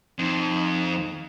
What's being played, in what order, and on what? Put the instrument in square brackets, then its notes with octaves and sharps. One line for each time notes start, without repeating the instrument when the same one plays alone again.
[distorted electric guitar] F2 [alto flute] D#4